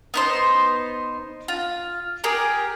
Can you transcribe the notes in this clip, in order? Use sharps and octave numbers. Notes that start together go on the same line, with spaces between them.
B3 D#4 C5
F4
G4 G#4 A#4